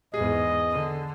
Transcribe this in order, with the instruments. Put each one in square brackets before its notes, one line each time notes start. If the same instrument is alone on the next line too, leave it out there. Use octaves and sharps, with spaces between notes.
[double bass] E2 G#2 [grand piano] G#4 [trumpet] D#5
[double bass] D3